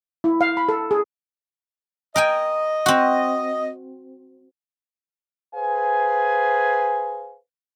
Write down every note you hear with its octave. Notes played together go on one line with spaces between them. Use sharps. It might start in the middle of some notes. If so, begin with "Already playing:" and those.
E4
F5
B5
A4
G#4
A#4 D#5 G5 G#5
C4 F#4
G#4 B4 C5 F5 G#5